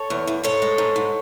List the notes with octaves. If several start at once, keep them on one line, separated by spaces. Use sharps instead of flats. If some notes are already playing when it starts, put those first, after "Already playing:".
Already playing: A4 C#5
E2
E2
G#2 A4 C#5
G#3
G#2
G#2